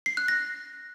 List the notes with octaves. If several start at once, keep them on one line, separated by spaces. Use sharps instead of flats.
C7
F#6
A#6